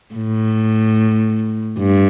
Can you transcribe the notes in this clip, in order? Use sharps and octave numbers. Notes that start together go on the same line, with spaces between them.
A2
G2